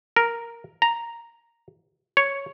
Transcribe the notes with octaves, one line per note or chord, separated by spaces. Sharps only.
A#4
A#5
C#5